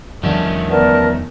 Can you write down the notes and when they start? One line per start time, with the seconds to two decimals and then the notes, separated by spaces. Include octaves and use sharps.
0.23 E2 D3 D#3 F3 G3 A3 C#4
0.69 B3 A#4 D5 A5